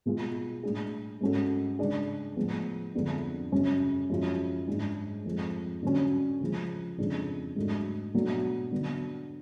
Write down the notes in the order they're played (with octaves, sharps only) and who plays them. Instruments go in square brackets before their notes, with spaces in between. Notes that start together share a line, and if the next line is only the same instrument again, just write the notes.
[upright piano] B2 G#3 B3 F4 G#4
A2 G#3 D4 G#4
G#2 G#3 C#4 F#4 A4
C#3 G#3 D4 G#4
A2 F3 G#3 B3
F2 D3 G#3 B3 D4
F#2 C#3 G#3 C#4
F#2 F3 G#3 C#4 F4
G#2 G#3 D4 G#4
F2 F3 G#3
D3 F#3 C#4
C#3 F3 G#3
F2 C#3 G#3 D4
G#2 F#3 A3 D4
B2 F#3 A3 D4
D3 F#3 B3 D4